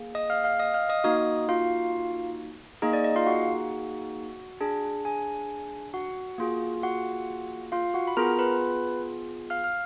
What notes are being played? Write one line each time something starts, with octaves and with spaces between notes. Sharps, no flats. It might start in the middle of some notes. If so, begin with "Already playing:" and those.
Already playing: A#3 G#4
D#5 D#6
F5 F6
F5 F6
D#5 D#6
F5 F6
D#5 D#6
A#3 D#4 F#4 D#5 D#6
F4 F5
A#3 D#4 G#4 D#5
D5
D#5
F4 F5
F#4 F#5
D4 G#4
G#4 G#5
F#4 F#5
A#3 F4 G#4
F#4 F#5
F4 F5
F#4 F#5
B5
B3 F4 G#4 A#4 A#5
B4 B5
F5 F6
F6